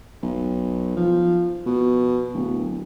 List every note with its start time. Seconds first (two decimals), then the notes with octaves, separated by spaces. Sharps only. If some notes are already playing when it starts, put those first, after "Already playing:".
0.22 B1
0.97 F3
1.66 B2
2.34 D1